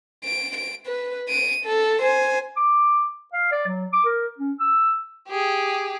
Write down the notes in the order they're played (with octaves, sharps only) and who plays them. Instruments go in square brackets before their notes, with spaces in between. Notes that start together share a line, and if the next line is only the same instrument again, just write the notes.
[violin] D7
D7
B4
D7 D#7
A4
C5 G#5
[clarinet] D6
F5
D5
F#3
D6
A#4
C#4
E6
[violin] G4 G#4